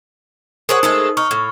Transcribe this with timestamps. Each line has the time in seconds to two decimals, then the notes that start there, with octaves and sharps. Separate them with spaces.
0.69 G#4 A#4 C5 C#5 F#5 D#6
0.83 G#3 A3 D#4 A4
1.17 D#4 C#6 F6
1.31 A2